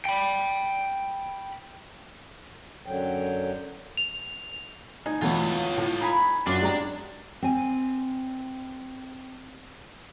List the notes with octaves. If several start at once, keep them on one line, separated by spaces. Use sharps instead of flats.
G5 B5
F#2 D3 F#3 G5
F7
D#4 G#5
E2 B2 E3 A3 B3 F4 C#5
A2
D#4 G#5 B5
F#2 D4 F4 F#4 D5 D6
G#3 G4 A#5
C4 G#5